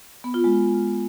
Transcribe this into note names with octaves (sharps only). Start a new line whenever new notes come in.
B3
F4
G#3